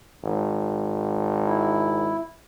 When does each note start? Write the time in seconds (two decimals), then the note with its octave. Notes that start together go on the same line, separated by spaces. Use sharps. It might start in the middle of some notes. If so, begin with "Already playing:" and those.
0.23 G#1
1.46 E4